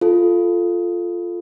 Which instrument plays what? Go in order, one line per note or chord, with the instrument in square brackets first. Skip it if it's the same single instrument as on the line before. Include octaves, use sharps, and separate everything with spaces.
[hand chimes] F4 A4